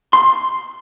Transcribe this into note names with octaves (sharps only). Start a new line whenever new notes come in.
C6